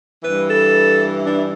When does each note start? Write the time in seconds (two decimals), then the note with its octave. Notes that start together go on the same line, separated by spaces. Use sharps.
0.24 G2 E3 B4
0.49 A4
1.26 D4